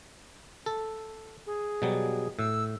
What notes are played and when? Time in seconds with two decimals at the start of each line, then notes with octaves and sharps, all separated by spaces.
0.66 A4
1.46 G#4
1.82 B2 F#3 G3
2.39 A2 E6